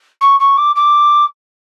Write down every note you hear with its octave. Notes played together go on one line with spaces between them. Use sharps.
C#6
C#6
D6
D6